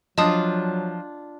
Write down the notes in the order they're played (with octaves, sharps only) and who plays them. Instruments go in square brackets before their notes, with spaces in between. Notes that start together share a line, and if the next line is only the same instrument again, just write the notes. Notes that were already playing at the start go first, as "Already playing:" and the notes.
[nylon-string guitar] F3 [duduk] F#3 [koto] D4 F4 [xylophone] D#5 A5 D#6